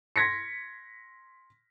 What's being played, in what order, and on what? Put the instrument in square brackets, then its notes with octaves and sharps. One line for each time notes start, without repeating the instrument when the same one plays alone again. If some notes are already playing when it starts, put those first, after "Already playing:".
[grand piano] C6 G#6 A#6 B6 C#7